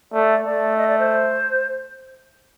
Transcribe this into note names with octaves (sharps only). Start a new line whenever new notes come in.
A3 D5
A3 D5
D#5
D5
C5